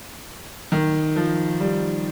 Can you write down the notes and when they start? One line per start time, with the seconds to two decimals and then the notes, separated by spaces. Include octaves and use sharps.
0.72 D#3
1.16 F3
1.60 G3